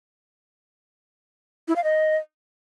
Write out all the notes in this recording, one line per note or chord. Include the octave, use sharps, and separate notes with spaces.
E4
F5
D#5